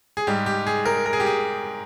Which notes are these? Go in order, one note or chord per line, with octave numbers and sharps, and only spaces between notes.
G#4
G#2 G3 G4
G4
G#4
A#4
A#4
G#4
G4
G#4